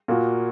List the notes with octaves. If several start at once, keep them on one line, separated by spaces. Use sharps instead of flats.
A#2 A#3 F#4